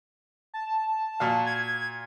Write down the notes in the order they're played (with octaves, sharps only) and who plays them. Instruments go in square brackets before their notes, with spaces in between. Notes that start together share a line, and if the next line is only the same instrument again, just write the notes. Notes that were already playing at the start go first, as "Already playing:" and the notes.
[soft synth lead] A5
[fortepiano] A#2 F#4 F5
[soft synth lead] G#6